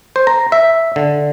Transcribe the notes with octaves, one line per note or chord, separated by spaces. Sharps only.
C5
A#5
E5
D3